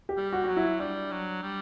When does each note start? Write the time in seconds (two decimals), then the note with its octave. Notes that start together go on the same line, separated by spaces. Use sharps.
0.09 G4
0.17 G3
0.33 F#4
0.44 F#3 F#4
0.57 E4
0.79 G3 D4
1.11 F#3
1.43 G3